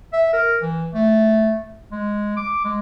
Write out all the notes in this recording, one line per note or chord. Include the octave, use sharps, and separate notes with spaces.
E5
A#4
E3
A3
G#3
D6
G#3